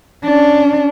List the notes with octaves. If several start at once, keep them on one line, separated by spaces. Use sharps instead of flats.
C#4 D4